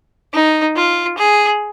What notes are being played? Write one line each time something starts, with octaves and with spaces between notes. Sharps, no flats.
D#4
F4
G#4